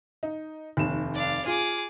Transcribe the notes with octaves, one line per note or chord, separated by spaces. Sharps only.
D#4
F1 D#2 E7
D5 F5
F4 G#4 D6